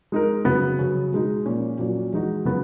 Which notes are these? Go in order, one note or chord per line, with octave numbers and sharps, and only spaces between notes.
G#3 D#4 A#4
C#3 F#3 B3
C#3 F#3 C#4
B2 G#3 D#4
A#2 A#3 C#4
A#2 F#3 C#4
E3 G#3 D#4 F#4
C#3 F#3 B3 F#4